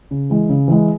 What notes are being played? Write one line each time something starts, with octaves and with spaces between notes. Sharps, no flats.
C#3
E3 G#3
C#3
E3 G#3